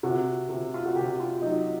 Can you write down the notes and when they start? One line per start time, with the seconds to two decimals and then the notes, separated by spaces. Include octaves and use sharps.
0.03 C3 F#4
0.49 C3
0.74 F4
0.85 F#4
0.95 C3 G4
1.20 F4
1.42 F#3 D#4